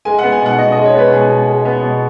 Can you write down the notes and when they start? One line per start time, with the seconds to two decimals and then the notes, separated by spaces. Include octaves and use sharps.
0.05 G#3 G#5
0.19 F#5
0.23 B3
0.32 G#5
0.41 B2 F#5
0.58 B2 D#5
0.72 D#5
0.77 G#3
0.85 C#5
0.94 B3 B4
1.12 B2 G#4
1.30 B2
1.48 G#3
1.65 B3
1.83 B2